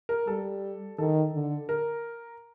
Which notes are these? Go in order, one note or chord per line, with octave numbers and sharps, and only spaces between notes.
A#4
G3 A4
D#3 A4
D3
A#4